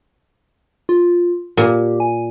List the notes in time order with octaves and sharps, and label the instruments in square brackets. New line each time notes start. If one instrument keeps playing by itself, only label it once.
[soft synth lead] F4
[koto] A#2 [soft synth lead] G4
[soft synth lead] G#5